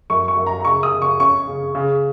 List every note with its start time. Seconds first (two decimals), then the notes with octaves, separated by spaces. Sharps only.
0.10 F#2 C#6
0.28 C#6
0.37 F#2
0.46 A#5
0.61 A#5
0.65 C#3 C#6
0.83 D#6
0.93 C#3
1.02 C#6
1.20 C#4 C#6
1.47 C#3
1.75 C#3